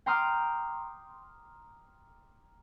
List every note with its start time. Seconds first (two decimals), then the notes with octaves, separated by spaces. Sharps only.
0.06 G5 A#5 C6 D6 D#6 F6